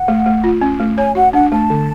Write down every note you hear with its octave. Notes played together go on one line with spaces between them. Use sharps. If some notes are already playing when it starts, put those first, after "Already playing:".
Already playing: F#5
A3
A3
F4
C#4
A3
C#5 G#5
F#4 F#5
D4 F#5
A3 A5
D3